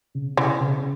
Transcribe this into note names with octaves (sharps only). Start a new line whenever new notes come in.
C#3
C#3 E3
C#3